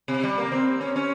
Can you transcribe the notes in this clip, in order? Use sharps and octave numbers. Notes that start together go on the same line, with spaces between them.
C3
G3
A#3
C4
C#4
C#4